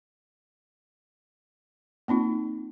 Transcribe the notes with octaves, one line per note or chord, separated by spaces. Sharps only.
A#3 C4 D#4 F4